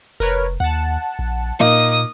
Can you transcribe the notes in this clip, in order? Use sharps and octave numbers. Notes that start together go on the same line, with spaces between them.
F1 A#4 B4 C#5
D#2 F#5 A5
A#1
A#2 A#3 D#4 D#6